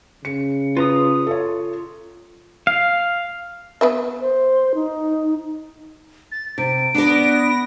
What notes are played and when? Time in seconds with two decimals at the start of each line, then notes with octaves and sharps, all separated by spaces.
0.25 C#3 C#7
0.77 F4 B4 A#5 D#6
1.27 A4 C#5
2.67 F5
3.81 B3 B4 E5
4.21 C5
4.75 D#4
6.32 A6
6.58 C3 D7
6.95 B3 D4 D5 A#6